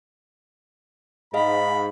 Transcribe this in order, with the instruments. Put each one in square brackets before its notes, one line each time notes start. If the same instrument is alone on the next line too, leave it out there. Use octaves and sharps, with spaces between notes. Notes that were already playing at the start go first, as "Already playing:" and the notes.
[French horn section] G#2 [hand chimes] G#4 D#5 F5 [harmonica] B5